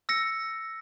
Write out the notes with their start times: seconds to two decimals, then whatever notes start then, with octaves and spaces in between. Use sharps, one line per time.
0.09 E6 A#6 C#7